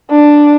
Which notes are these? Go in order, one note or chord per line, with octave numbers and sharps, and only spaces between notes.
D4